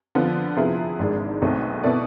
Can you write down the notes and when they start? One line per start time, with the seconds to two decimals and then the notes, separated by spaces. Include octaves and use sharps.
0.15 D3 F3 B3 F4
0.57 C3 F3 B3 E4 G#4
0.99 G#1 G#2 G#3 D4
1.42 B1 B2 A3 C4
1.84 B2 B3 E4 A4 D5